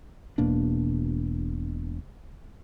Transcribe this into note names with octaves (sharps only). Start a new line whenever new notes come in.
E1 B2 A#3 D4